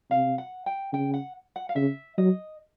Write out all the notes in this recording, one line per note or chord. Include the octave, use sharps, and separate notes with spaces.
C3 F5
F#5
G5
C#3 G5
F#5
F#5
F5
C#3 E5
F#3 D#5